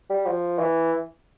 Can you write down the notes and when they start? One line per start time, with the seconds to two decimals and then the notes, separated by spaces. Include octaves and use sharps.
0.10 G3
0.26 F3
0.59 E3